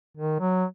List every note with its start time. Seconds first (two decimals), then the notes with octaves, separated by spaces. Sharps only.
0.17 D#3
0.40 F#3